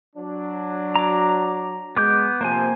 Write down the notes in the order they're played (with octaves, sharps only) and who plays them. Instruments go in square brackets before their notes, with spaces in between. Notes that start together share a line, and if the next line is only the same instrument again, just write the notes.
[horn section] F#3 D4
[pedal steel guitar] A#5 D6
[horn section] G#3 [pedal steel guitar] B3 D6 G6
[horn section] C3 F3 [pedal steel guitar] A#3 C5 G#5